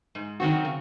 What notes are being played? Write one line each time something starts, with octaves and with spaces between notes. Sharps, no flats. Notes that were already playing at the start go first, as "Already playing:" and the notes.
G#2
D#3 F#3 C4 F#4
C#3